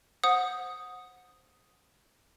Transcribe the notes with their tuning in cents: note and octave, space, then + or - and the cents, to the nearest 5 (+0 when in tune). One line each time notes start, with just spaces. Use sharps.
C5 +0 F#5 -15 D#6 +0